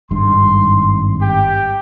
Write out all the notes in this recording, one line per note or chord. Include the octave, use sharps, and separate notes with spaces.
G#1 G2 C6
G4 G5